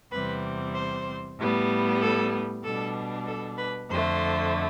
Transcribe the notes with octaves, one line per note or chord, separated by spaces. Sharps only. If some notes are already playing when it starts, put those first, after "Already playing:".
E2 C3 G3 C4 B4
C5
A2 G3 B3
A4
B2 G3 D4 A4
A4
B4
F2 D3 A3 C5